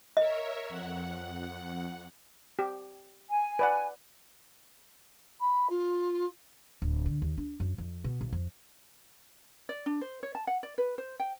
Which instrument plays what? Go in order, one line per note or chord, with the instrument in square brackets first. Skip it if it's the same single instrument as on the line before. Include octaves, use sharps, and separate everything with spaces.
[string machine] A#4 C#5 E5 [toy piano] D#5
[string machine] F2 F#5
[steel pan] G4
[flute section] G#5
[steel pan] B4 D5 F#5
[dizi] B5
F4
[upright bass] D1
D3
D#2
D4
F#2
F2
B2
B1
F2
[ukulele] D5
D4
C5
C#5
A5
F#5
D5
B4
C5
G5